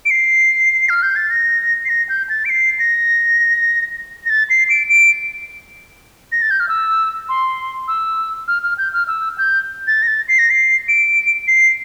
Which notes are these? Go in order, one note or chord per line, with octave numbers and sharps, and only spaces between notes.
D7
C7
F6
G6
A6
A#6
C7
A#6
G6
A6
D7
C7
A#6
A#6
A6
C7
D7
D7
A#6
A6
G6
F6
E6
C6
E6
F6
F6
G6
F6
E6
G6
A6
A#6
A6
C7
A#6
C7
D7
C7